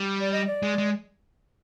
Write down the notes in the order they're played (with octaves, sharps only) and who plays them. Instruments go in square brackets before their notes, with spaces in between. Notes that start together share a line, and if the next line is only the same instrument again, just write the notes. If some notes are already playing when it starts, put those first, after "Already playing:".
Already playing: [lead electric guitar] G3
[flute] D5
D#5
D5
[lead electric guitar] G#3
G#3